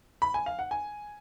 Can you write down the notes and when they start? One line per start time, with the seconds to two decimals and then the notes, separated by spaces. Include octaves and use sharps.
0.22 B5
0.34 G#5
0.46 F5
0.59 F#5
0.71 G#5